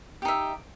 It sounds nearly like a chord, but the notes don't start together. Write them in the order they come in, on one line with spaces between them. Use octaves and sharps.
G4 D#4 E5